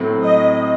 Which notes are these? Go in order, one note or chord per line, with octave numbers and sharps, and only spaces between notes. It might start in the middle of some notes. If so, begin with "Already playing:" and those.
Already playing: A2 F#3 A3 C4
D#5